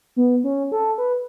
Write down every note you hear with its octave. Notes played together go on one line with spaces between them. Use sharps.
B3
C#4
A4
B4